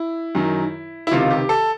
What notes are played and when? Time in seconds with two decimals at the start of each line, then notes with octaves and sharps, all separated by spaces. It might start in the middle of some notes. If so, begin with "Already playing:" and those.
Already playing: E4
0.35 F#2 D#3
1.07 E4
1.11 C#2 C3 D#3 F4
1.31 G4
1.49 A4